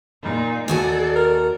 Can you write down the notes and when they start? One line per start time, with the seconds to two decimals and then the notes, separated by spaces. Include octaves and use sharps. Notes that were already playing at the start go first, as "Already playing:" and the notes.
0.22 A#2 D#4
0.68 D#2 F#4 A4 D5 G#5
1.16 A#4